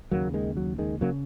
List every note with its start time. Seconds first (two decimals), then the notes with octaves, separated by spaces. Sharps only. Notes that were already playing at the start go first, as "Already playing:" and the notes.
0.11 D#2 C#3 F#3 A#3
0.34 D#3 G#3
0.57 F#3
0.79 D#3 G#3
1.01 C#3 F#3 A#3